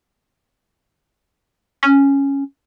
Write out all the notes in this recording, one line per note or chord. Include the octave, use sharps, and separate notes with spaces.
C#4